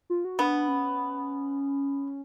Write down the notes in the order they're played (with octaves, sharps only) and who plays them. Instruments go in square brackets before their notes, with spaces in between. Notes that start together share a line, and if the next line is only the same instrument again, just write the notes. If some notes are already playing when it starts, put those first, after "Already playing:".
[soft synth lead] F4
F#4
[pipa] B3 [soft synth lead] D4
[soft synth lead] C#4